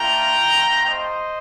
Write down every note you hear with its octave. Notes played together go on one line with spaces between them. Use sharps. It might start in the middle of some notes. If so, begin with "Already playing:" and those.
Already playing: A3 D4 F4 G5 A#5
A3 C4 F4
C5 D#5